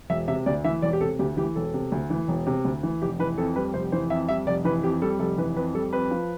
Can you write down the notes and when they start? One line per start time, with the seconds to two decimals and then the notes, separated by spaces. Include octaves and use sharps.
0.10 E1 E5
0.28 C3 E5
0.46 D2 D5
0.64 E3 E5
0.82 E1 D5
0.93 G4
1.01 C3 A4
1.19 D2 G4
1.37 E3 G4
1.55 E1 A4
1.74 C3
1.92 D2
2.10 E3
2.28 E1
2.46 C3
2.65 D2
2.83 E3
3.02 F1 G4
3.19 E3 B4
3.38 F2 A4
3.56 G3 B4
3.74 F1 C5
3.92 E3 C5
4.10 F2 E5
4.29 G3 E5
4.47 F1 D5
4.65 E3 B4
4.83 F2 G4
5.02 G3 A4
5.20 F1 A4
5.38 E3 B4
5.56 F2 B4
5.74 G3 A4
5.93 F2 B4
6.11 F3